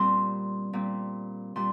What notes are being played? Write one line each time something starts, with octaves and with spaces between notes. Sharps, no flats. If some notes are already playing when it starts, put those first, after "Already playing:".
Already playing: A#2 G3 C4 C6
A#2 G3 C4
A#2 G3 C6